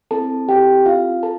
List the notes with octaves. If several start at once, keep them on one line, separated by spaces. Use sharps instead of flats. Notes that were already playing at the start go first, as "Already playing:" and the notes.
C4 E4 A4 A5
G4 G5
F4 F5
A4 A5